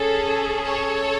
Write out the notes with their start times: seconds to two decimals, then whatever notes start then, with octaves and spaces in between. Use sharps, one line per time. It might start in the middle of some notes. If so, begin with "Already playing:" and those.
Already playing: C#4 G#4 A4
0.65 A4 C#5